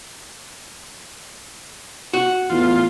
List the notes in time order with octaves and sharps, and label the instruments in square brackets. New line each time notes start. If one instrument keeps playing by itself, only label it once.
[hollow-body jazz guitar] F#4
[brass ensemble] E2 A2 [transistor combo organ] F4